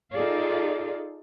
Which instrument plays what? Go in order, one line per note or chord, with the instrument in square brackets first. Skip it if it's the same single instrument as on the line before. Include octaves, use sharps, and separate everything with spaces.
[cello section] D#4 F4 G#4 A4 D5 F5